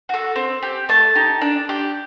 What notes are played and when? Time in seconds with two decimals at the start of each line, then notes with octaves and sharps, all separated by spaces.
0.09 F#4 A4
0.36 C4
0.63 G4
0.89 A3 A5
1.15 D#4 G4
1.41 D4
1.69 G4